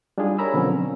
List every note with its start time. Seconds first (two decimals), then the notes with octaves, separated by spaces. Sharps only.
0.18 G3 D4 D#4 F4 G#4
0.38 A#4 C#5 G#5 A#5 B5 E6
0.54 B2 D3 F3 F#3 C4 C#4